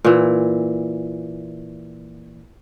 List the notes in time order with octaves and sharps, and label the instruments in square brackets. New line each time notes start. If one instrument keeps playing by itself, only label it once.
[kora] A#2 E3